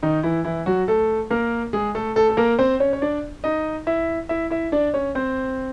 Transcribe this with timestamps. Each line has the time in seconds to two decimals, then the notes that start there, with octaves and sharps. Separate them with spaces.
0.03 D#3 D#4
0.23 E3 E4
0.44 E3 E4
0.66 F#3 F#4
0.88 A3 A4
1.30 A#3 A#4
1.73 G#3 G#4
1.95 A3 A4
2.16 A3 A4
2.29 A4
2.37 A#3 A#4
2.59 C4 C5
2.80 C#4 C#5
2.93 C#5
3.02 D4 D5
3.44 D#4 D#5
3.87 E4 E5
4.29 E4 E5
4.50 E4 E5
4.72 D4 D5
4.94 C#4 C#5
5.15 C4 C5